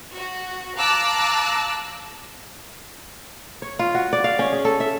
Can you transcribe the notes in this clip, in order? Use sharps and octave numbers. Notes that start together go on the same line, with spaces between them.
F#4
F5 A5 A#5 D6 E6 F#6
C#5
F4
F#4
D5
F5
C#4
G#4
A4
E5